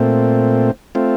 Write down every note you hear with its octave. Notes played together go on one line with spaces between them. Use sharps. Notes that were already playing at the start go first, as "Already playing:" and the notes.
Already playing: A#2 A3 C4
A3 C4 F4